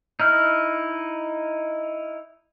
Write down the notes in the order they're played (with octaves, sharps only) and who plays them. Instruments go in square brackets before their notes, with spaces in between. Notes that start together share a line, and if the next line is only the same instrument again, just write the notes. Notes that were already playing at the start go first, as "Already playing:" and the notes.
[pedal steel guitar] D#4 E4 F6